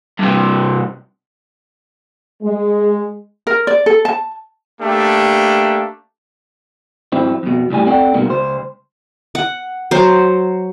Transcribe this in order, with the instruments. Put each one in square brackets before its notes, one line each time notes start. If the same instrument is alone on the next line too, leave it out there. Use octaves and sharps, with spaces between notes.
[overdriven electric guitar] G2 C3
[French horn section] G#3
[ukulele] A#4
D5
A4
A5
[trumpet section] A3 A#3 D4 G4
[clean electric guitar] G#2 F3 C4 E4
F2 B2
C#2 A2 G3 G#5
C4 A4 D5 F#5 G5
G2 B2 G#3 A#3 D#4
C#2 C5
[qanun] F#5
F#3 C5